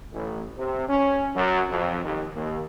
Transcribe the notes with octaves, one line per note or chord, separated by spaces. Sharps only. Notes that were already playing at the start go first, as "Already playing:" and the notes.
A1
C3
C#4
F#2
F2
D#2
D#2